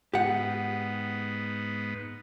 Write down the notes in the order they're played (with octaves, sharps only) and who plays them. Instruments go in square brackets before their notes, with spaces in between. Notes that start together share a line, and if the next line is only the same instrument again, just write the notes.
[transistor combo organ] G#2 B3 [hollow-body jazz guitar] G4 F#5